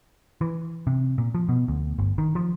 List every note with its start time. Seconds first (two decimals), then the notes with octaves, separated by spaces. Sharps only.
0.41 E3
0.87 C3
1.18 A#2
1.35 F3
1.49 B2
1.68 D2
1.98 G1
2.18 D#3
2.35 F3